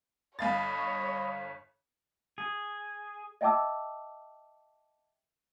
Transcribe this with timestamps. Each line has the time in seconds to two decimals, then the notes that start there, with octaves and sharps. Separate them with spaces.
0.39 G1 C#5 D#5 F5 B5 A6
2.38 G#4
3.41 D#5 E5 G5 A5 D6 E6